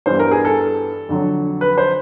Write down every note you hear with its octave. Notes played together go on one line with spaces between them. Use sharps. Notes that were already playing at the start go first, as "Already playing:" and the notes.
G2 E3 G3 B3 C5
A#4
G#4
A4
F2 D3 F#3
B4
C5